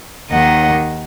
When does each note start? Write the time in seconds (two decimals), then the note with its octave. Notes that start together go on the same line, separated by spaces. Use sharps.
0.31 D#2 D#3 D#5 F#5